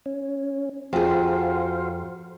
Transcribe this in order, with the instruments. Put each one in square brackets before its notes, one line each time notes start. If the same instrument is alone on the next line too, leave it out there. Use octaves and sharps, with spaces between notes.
[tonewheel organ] C#4
[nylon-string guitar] F2 G#4 [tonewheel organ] F#4 C5 F5